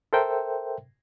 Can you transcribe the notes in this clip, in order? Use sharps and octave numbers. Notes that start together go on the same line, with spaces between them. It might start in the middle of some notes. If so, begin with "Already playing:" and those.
A4 A#4 C5 E5 G5